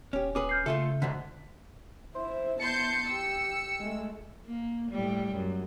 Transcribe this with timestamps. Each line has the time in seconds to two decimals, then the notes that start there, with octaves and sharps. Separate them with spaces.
0.13 D#1 C#4 G4
0.35 C#4 G#4 B4 D6
0.49 F6 G6 C7
0.66 C#3 A3 F4 A4 E5 G7
1.02 D2 G#2 D3 B6
2.15 E4 C5 E5
2.60 B3 E4 A5 C6 G6 C#7
3.07 G4 E6
3.79 G#3 A3
4.46 A#3
4.91 A2 G3
5.33 F#2